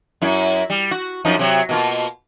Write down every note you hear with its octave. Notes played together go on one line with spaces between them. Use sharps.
F#2 E4
G3
F#4
F#2 F3 D#4
C3 F#3
B2 A#3 F4